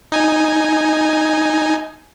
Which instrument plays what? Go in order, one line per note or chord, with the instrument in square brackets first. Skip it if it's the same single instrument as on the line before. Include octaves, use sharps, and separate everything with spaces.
[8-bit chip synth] D#4 G#5